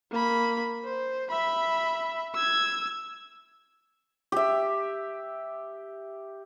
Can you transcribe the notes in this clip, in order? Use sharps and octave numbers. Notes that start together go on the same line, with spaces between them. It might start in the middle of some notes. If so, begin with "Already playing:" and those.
A#3 B5
C5
E5 B5
E6 G#6
G4 E5